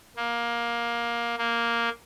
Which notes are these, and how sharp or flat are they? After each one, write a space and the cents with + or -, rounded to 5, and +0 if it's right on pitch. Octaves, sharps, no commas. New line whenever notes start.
A#3 +15
A#3 +0